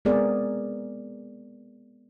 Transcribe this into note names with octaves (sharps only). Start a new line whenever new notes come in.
G#3 B3 C4 G#4 A#4 D5